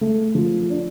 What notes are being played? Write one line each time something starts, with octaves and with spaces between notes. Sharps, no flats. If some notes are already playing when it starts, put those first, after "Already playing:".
A3
F3
D4